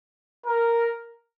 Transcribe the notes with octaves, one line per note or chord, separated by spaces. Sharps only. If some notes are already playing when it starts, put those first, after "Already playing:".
A#4